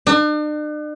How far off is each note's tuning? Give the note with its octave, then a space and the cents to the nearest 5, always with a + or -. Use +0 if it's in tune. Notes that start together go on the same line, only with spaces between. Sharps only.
D4 +45